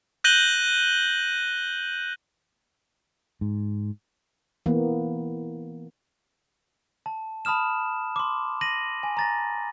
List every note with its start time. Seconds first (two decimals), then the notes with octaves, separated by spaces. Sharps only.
0.24 F#6 G6 A#6 D#7 F#7 G7
3.41 G#2
4.66 E3 A#3 B3
7.06 A5
7.45 A5 B5 D#6 F6 E7
8.16 C6 D6
8.61 A#6 D#7 F#7
9.03 G#5
9.17 A#5 A6 A#6